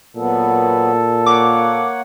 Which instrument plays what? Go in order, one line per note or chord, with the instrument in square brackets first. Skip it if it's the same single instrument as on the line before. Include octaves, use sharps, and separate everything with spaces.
[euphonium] A#2 [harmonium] F#3 B3 [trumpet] A4
[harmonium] A#3 C#5 F#5 [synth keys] D6